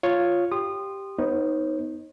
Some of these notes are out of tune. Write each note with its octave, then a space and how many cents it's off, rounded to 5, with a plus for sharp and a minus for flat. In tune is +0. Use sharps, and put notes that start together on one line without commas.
F4 +0 C#5 +0
G4 +0 C6 +0 D#6 -25
B3 +0 D#4 +5 C#5 -35